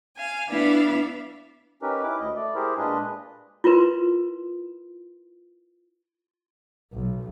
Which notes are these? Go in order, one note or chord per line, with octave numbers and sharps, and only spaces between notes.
F5 G#5
B3 D4 E4 D5 E5 F5
C#4 D#4 G4 A#4 B4
E4 D6
D2 D#5
A3 D5
E4 G4 G#4 A#4 C5
A#2 G#3 D4 F4 B4 D#5
E4 F4 A#4 B4 C6
B1